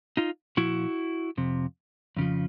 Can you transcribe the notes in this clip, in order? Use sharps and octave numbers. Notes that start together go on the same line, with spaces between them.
D#4 F4
A#2 F3 E4 F#4
F2 C3
F2 C#3 F3